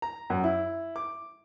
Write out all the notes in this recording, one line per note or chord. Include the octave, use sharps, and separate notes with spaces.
A#5
F#2
E4
D6